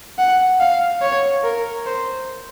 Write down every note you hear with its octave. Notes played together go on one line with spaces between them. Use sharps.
F#5
F5
C#5
A#4
C5